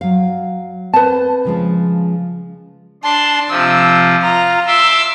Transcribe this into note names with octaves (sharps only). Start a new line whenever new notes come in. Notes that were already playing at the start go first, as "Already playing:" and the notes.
F#3 F5
C4 B4 A5
C#3 F3 G#3
D4 A5 C6
C3 F3 E6
F4 A#5
E5 C6 D6 E6